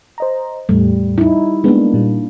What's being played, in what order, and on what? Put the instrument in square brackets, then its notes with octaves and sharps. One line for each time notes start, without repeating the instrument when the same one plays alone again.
[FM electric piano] C5 D#5 A#5
[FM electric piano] E2 A2 A3 [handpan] G3
[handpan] D#4 E4
[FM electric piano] G#3 B3 [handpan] A#3 D4
[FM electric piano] A#2 G3